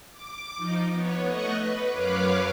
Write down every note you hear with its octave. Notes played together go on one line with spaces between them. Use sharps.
D6
F3 D#4
B3 C#5
A3 D#5 F#5 C#6
B4
F#2 B4 C#5 F5 D6